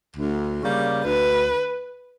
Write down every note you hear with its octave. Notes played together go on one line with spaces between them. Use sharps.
D2
C#3 G3 A#3
D2 B4